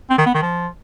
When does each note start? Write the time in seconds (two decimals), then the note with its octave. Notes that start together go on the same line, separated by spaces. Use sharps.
0.10 C4
0.18 D#3
0.26 B3
0.34 D#3
0.42 F3